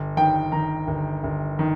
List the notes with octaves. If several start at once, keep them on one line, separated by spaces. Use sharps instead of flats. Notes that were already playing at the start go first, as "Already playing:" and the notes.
Already playing: G1
D#3 G5
D#3 A#5
G1
G1
D#3